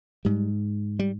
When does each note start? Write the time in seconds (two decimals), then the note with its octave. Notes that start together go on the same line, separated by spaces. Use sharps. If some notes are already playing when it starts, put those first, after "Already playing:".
0.25 G#2 G3
0.99 G3